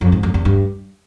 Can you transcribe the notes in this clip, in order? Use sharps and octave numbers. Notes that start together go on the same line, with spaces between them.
F2
G#2
F2
E2
G2